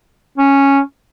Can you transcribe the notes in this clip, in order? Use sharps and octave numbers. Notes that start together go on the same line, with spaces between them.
C#4